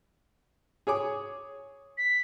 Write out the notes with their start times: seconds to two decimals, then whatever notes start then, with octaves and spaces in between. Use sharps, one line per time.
0.87 G#4 C#5 D6
1.98 B6